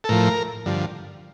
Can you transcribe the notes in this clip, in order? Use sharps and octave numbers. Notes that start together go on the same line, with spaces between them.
A4
A2 F3 A#4
G2 D3 F3